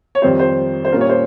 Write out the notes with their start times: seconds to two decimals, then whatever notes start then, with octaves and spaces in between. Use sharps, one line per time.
0.15 C#5
0.22 F2 D#3 G3 C4 F4 C5
0.39 C5
0.85 C5
0.92 A#2 G3 C#4 F4 A#4
1.01 C#5
1.09 C5